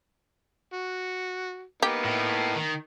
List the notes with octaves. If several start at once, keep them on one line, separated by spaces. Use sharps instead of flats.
F#4
A#3 B3 D#4 G4
A2
D#3